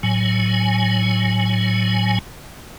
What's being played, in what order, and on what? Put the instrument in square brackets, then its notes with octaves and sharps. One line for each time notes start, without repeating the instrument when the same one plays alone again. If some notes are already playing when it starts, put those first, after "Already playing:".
[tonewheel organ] A2 F#3 G#5